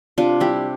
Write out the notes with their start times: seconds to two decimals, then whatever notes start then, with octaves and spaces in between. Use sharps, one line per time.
0.18 C3 D4 F4
0.40 G3 E4 G4